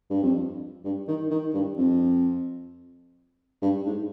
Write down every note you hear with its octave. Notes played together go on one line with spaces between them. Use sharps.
G2
F2
G2
D#3
D#3
G2
F2
G2
G#2